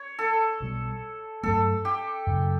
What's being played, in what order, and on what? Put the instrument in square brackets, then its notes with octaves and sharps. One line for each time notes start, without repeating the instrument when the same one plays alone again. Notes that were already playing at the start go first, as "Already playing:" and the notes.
Already playing: [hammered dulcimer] C#5
A4
[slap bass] B1 B2 G3
[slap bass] G2 F#3 A3 [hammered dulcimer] A4
[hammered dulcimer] G4
[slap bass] F#2 C#3 F#3